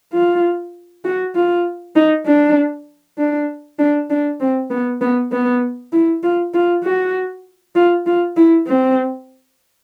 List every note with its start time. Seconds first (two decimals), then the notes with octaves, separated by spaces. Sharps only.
0.13 F4
1.05 F#4
1.35 F4
1.96 D#4
2.27 D4
3.18 D4
3.79 D4
4.10 D4
4.40 C4
4.70 B3
5.01 B3
5.32 B3
5.93 E4
6.23 F4
6.54 F4
6.84 F#4
7.75 F4
8.06 F4
8.37 E4
8.67 C4